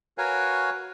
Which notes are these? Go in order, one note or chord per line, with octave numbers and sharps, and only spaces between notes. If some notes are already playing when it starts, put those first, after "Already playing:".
F#4 A#4 B4 C#5 F5 G#5